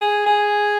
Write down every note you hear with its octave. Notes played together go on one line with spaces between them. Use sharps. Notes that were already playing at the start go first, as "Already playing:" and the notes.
G#4
G#4